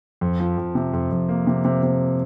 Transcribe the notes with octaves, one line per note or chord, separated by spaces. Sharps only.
F2
F3
F2
C3
F2
F2
A#3
C3
C3
C3